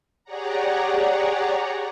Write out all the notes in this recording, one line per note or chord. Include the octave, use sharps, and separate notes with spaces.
G4 G#4 C#5 D5 F#5 A#5